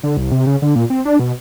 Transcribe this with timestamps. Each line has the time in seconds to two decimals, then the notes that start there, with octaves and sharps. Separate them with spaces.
0.03 D3
0.17 C2
0.32 C3
0.47 C#3
0.62 D3
0.75 A#2
0.90 C4
1.05 D4
1.19 B2